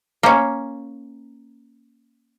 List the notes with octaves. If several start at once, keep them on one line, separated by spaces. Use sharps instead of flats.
A#3 C#4